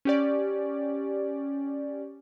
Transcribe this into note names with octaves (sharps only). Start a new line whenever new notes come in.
C#4 G4 D5